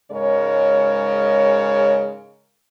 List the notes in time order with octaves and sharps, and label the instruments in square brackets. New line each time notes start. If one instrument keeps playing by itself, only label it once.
[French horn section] G#2 C#3 G#3 A#4 C#5